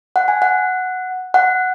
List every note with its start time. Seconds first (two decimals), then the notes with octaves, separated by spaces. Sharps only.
0.16 F#5
0.28 G#5
0.42 F#5
1.34 F#5